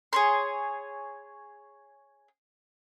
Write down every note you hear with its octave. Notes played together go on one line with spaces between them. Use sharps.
G#4 C#5 C6